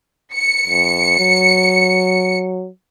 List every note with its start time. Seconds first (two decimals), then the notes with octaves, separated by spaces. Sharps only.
0.34 C#7
0.67 F2
1.19 F#3